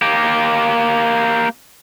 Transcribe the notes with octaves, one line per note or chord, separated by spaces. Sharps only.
A#3 G4